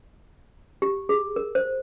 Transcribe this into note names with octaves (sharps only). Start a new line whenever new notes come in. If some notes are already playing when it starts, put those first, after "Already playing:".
G4
G#4
A#4
C5